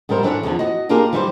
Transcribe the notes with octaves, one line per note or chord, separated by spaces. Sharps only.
G#2 F#3 G3 A#4 C5
E3 D4 A4 C#5 F#5
E2 D3 D#3 F3
F#4 D#5
A#3 D4 F4 G4 G#4 A#4
E3 F#3 G3 E4 G4 C5